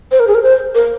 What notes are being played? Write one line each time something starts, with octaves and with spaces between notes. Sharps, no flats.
C5
A#4
G#4
A#4
C5
A#4